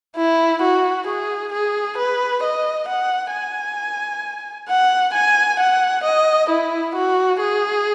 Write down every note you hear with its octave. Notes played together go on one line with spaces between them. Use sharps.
E4
F#4
G#4
G#4
B4
D#5
F#5
G#5
F#5
G#5
F#5
D#5
E4
F#4
G#4